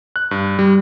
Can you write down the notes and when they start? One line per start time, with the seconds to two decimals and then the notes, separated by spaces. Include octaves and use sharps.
0.16 F#6
0.31 G2
0.59 G3